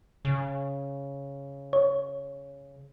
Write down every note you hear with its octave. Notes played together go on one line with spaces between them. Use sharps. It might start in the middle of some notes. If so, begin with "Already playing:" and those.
C#3
C#5